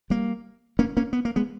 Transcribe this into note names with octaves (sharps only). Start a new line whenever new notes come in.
G3 A#3
A#3 C#4
A#3 C#4
B3
A#3
G#3 B3